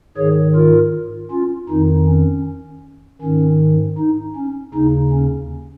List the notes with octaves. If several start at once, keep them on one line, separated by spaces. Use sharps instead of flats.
G#2 D#3 G#4 C#5
F4 A#4
C#4 F4
F2 D#3 D#4
C#4
G#2 D#3 C#4
D#4
C#4
D#2 C#3 D#4
C#4